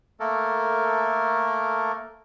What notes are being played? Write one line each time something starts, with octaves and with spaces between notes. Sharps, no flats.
A3 A#3 A4 A#4